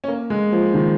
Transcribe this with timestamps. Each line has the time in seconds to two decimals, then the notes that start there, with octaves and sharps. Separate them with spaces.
0.04 C#4
0.08 A#3
0.30 G#3
0.52 F3
0.74 D#3